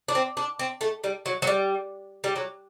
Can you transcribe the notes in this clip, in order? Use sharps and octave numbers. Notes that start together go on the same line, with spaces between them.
D4
C4
D4
C4
A3
G3
F#3
F#3
G3
G3
F#3